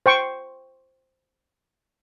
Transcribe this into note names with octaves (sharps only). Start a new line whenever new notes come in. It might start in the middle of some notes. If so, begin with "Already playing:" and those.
C5 G5 C#6